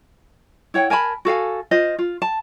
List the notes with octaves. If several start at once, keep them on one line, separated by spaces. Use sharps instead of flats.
E4 C#5 F#5 G5
A#4 G#5 A5 B5
F#4 A4 F5 G#5
F4 C5 D#5
F4
A5